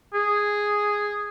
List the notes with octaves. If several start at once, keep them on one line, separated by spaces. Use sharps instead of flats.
G#4